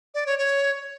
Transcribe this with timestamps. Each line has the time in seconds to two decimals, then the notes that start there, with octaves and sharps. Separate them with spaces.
0.14 D5
0.26 C#5
0.38 C#5